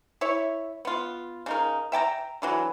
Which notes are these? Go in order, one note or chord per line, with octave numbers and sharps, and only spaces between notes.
E4 C#5 E5
B3 F4
C#3 D#4 A#4
E5 G5 A5 A#5
D3 E3 F#3